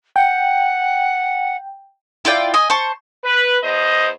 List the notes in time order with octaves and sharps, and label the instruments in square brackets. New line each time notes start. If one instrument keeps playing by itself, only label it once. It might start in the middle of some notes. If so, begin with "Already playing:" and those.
[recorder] F#5 [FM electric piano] G5
[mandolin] E4 F4 D5 G5
D#5 G#5
C5 A5 C#6
[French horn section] B4
E2 C5 D#5